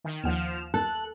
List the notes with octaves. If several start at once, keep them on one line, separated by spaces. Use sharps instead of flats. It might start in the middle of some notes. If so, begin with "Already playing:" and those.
D#3
D#2 F3 F#5 F6 E7
A4 F#6